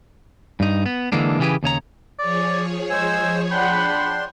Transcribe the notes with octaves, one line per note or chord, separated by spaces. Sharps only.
G2 D#4
B3
D3 E3 G#3 A#3 D4
C#3 E3 B3 G4 G#4 B4
D#2 C#3 C#5 A#5
F3 G#4 C#5 D5
G#3 C5 G#5 E6
D4 F#5 G5 B5 C6